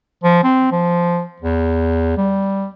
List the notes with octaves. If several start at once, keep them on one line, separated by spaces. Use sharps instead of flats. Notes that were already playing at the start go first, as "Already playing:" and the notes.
F3
C4
F3
E2
G3